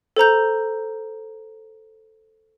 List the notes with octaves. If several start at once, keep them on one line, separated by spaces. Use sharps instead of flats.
A4 C5 A#5 G6